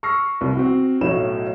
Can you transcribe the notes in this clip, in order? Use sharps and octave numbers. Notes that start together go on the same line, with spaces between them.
C#6 E6 F6 A#6 C7
C2
C4 F#4
B1 A2 F#3 E7